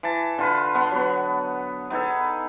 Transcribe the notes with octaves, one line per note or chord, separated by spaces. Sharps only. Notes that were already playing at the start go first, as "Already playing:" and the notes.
E3 A5
D3 F4 B4
B3 F#5 C6
F#3 B3
B3 D#4 G#4 A4